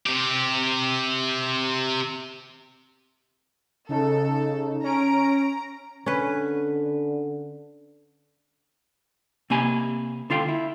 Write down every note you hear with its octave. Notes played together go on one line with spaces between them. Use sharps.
C3 G4
C#3 D#4 A4
C#4 A#5 D7
D3 C#4 B4
C3 A#3 G#5 B5
D3 F4 F5 G5
E4